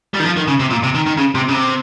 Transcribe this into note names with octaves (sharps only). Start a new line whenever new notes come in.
G3
D#3
F3
D#3
C#3
C3
A#2
C3
D#3
D#3
C#3
C3
C#3
C3